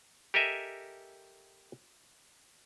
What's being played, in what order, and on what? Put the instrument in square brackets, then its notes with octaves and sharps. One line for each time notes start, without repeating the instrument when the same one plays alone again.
[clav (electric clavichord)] G4 A4 A#4 D#5 E5 G#5